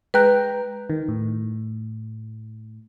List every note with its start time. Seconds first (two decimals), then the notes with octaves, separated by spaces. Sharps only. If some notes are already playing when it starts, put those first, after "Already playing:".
0.14 G#3 B4 G5 A#5 F#6
0.90 D#3
1.08 A2